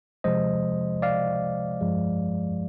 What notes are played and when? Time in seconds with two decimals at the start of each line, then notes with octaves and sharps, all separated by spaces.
0.24 C3 F3 G#3 C5 D#5
1.02 D5 F5
1.81 G2 F3 G#3